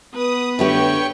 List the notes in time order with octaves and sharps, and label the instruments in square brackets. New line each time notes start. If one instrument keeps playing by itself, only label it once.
[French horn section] B3 [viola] B4 [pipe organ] D#6
[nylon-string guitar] D3 A3 G4 [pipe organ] C#5 G5 C#6